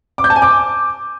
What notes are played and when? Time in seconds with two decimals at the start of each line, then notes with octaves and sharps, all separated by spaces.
0.18 D6
0.24 G6
0.30 A5
0.36 G#5
0.42 D6